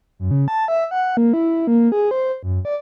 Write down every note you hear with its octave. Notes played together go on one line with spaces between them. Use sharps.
F#2
C#3
A5
E5
F#5
A#3
E4
A#3
G#4
C5
F#2
D5